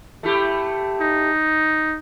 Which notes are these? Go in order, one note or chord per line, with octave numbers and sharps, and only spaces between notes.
A3 E4 G4
D#4